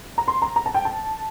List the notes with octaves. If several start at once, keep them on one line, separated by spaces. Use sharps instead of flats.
A#5
C6
A#5
A#5
A5
G5
A5